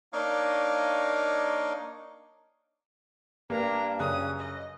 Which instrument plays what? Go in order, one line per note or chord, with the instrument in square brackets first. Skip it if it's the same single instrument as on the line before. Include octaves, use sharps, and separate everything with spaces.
[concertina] A#3 D4 D#4 C#5 D#5 F5
[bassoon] G2 [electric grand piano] A#3 [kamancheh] D4 A#5
[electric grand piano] F#2 C#3 F#6 [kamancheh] C#4 D#6
[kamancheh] D#5